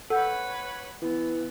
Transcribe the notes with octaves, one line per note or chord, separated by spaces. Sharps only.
A4 B4 C#5 F#5 G6
E3 B3